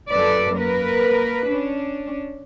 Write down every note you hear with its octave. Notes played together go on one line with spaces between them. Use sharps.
F#2 A4 B4 D5
A#3 A#4 B4
C#4 D4